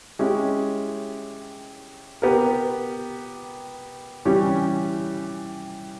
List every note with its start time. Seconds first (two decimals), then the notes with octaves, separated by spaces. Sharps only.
0.19 G#3 C#4 E4 G4
2.22 B3 G4 A#4
4.25 E3 G3 C#4 G4